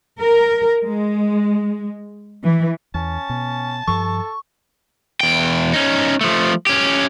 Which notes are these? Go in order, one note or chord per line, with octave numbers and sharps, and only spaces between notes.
A#4
G#3
E3
E2 C#4 A5
B2
G2 F3 A4 C#6
E2 G5
C#4 D#4
F3 A3
C#4 G4